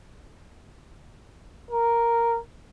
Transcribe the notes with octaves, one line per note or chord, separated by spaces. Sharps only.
A#4